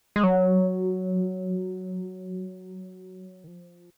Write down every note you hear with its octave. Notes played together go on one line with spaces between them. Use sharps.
G#3
F#3
D#3
F3